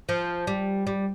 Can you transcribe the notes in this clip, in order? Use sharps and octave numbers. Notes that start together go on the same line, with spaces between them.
F3
G3
G3